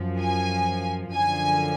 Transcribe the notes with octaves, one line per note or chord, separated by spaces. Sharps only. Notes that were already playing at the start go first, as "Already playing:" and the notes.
Already playing: F#2 F3
G#5
F#2 D3 F3 G#5